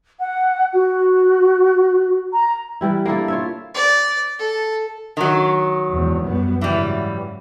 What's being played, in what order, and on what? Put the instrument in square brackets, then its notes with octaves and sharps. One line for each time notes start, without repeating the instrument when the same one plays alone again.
[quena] F#5
F#4
A#5
[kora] E3 G3 E4
A#3 D4 E4 A4
F4 C#5 E5
[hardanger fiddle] D5
A4
[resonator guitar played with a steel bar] D#3 F#3
[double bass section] E2 G#2 C3
F#2 G3 B3
[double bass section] G#2 C#3 F#3 [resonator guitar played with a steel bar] E3 G3